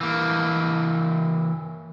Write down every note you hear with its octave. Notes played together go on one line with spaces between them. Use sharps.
E3 A#3